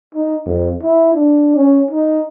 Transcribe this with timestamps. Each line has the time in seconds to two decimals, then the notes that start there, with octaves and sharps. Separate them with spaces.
0.15 D#4
0.46 F2
0.83 E4
1.15 D4
1.57 C#4
1.91 D#4